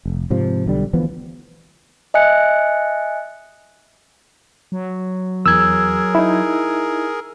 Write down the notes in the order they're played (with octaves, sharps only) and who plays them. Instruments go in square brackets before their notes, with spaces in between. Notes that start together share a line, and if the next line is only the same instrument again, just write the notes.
[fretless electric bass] F1
G#2 C3 F3
B1 D3 G3
D2 E3 F3 B3
[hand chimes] D#5 E5 G#5 F#6 C#7
[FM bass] F#3
[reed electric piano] E2 [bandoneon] G#4 A#4 [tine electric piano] E6 G#6
[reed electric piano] D#4 E4